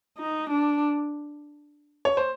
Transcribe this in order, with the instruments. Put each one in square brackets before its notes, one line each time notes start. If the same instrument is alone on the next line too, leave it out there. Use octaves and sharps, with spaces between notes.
[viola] D#4
D4
[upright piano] C#5
C5